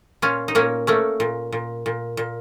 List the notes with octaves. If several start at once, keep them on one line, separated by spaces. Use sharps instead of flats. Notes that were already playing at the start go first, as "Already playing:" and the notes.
A#2 C#4 F4
D#4
A#2 A#3 C#4
A3 A#3 C#4
A#2
A#2
A#2
A#2